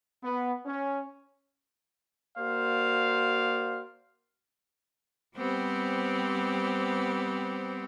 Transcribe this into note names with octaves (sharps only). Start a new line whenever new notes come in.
B3
C#4
A#3 F#4 C5 D5 F5
G3 B3 C4 G4 C5